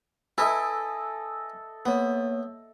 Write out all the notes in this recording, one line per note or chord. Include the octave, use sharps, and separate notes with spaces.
E4 A4 B4 D#5 E5 G#5
A#3 B3 C#5